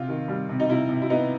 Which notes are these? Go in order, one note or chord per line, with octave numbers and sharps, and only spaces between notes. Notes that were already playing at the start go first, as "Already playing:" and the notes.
Already playing: C3 F4
D#3
G3
C3
D#4
C3 E4
C3
E4
B3 D#4